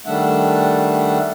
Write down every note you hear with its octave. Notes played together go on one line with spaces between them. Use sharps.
D#3 G3 A3 D4 E5 F#5